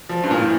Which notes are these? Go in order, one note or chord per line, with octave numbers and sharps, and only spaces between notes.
F3
G2
A#2
A2